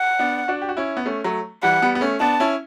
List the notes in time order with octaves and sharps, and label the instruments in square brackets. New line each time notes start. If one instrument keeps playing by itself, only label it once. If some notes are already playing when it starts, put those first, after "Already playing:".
Already playing: [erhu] F#5
[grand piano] B3 D4
D4 F#4
G4
F#4
C#4 E4
B3
A3 C#4
F#3 A3
[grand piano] E3 G3 [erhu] F#5
[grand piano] G3 B3
B3
A3 C#4
[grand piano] B3 D4 [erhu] A5
[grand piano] C#4 E4